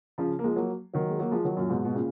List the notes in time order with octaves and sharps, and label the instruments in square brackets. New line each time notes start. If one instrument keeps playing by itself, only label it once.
[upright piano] C#3 F3
A#3
F3 G#3
F#3 A#3
D#3 F#3
G#3
F#3 A#3
F3 G#3
D#3 F#3
F#2 A#2
G#2 B2
B2
A#2 C#3